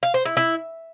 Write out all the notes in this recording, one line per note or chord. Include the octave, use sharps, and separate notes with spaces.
F5
C5
E4
E4